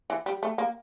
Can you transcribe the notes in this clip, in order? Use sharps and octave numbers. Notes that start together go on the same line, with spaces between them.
E3
G3
A3
A#3